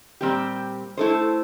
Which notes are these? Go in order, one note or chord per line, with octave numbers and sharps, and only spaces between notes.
A#2 G3 C4 G4
A3 E4 A4 C5